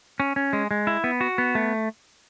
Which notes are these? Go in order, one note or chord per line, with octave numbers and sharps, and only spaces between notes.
C#4
C#4
G#3
G#3
E4
B3
F#4
B3
A3